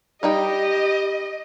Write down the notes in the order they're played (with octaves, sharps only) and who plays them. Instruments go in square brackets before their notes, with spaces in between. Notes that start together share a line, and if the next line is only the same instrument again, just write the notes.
[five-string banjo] G3 D#4 G5 [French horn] G4 [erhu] D#5